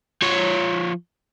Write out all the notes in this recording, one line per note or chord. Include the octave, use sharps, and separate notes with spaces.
F3 C#5